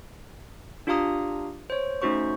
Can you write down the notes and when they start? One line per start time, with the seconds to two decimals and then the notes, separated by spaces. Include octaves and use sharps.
0.87 D4 F4 G4 F5 A#5 D#6
1.70 C5 C#5
2.02 A3 C#4 D#4 F#4 C5 C#6